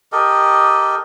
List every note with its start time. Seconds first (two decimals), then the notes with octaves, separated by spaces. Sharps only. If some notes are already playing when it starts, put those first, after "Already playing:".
0.12 G4 A4 A#4 D#5